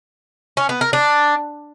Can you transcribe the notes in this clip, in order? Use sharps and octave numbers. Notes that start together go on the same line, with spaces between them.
C#4
B3
A#4
D4